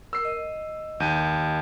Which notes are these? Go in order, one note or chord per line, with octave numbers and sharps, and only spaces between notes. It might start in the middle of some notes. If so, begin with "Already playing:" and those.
A#4 E6 C7
D#5
D#2 G6 D#7